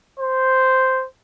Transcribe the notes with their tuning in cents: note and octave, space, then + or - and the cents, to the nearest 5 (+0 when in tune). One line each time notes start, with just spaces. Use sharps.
C5 -5